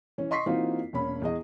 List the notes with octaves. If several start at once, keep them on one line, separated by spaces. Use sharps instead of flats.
E3 C#4
D#5 C6 C#6 B6 C7
E3 A#3 C4 D#4 F4 F#4
E1 A#3 C#4 B5
E2 G#4 D#5